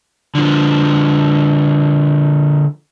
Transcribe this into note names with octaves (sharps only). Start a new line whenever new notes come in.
D3 F3